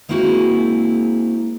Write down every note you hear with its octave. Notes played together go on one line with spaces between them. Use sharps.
G#3 A#3 C4 E4 F#4 G#4